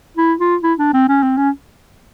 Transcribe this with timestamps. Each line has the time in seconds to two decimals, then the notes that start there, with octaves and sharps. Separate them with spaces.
0.17 E4
0.40 F4
0.63 E4
0.79 D4
0.94 C4
1.08 C#4
1.23 C4
1.37 C#4